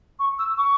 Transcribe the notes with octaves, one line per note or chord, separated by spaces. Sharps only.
C#6
E6
C#6